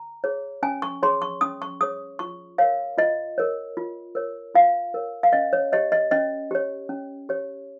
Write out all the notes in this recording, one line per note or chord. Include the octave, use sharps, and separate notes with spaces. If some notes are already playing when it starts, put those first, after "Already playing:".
Already playing: A#5
G#4 C#5
C#4 G#5
C#6
G#4 C#5 C6
C#6
C#4 D#6
C#6
G#4 C#5 D#6
F4 C#6
A#4 C#5 F5
F4 D#5
A#4 C#5
F4
A#4 C#5
F4 F5
A#4 C#5
F5
C#4 D#5
C#5
G4 C#5 D#5
D#5
C#4 D#5
G4 C#5
C#4
G4 C#5